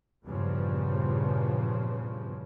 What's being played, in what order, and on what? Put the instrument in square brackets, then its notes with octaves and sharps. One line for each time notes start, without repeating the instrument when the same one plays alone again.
[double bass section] E2 G2 A#2 C#3 F3